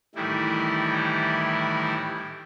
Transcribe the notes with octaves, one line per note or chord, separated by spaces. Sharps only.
A2 D#3 E3 G3 E4